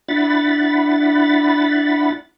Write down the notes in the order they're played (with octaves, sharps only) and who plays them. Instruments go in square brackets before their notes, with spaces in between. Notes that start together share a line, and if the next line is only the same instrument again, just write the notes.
[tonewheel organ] D4 E4 F#5 B5 A6